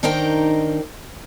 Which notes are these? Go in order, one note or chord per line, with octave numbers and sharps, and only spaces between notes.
D#3 D4 D#4 A#4 C5 G5